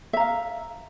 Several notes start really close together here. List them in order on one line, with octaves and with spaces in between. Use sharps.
E5 A#5 F5